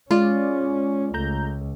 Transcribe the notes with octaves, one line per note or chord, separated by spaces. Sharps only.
G#3 C#4 F4 D5
C#2 A3 A#5 G6